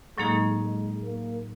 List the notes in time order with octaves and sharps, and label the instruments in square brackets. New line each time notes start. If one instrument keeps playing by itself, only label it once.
[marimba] A2 F#3 A#3 D#4 G#4 [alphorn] G#3
[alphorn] G#3
A#3